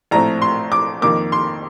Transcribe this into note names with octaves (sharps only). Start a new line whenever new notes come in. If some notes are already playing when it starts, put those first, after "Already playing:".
A#1 A2 A3 C4 A#5
C6
D6
F2 D#3 A#3 D6
C6